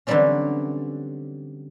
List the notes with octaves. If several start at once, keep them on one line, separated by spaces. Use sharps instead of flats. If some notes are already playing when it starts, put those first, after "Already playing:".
D3 E3 F#3 G3 C4 C#4